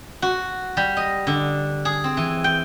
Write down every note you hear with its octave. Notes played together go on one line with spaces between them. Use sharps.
F#4
G3
D#5
D3
G#4
C4
E3
G5